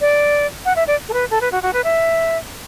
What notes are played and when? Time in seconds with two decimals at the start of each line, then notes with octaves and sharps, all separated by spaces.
0.01 D5
0.65 F#5
0.76 E5
0.87 D5
1.08 A4
1.13 B4
1.31 A4
1.41 B4
1.52 F#4
1.63 F#4
1.73 B4
1.84 E5